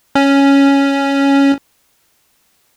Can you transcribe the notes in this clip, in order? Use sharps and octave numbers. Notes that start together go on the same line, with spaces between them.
C#4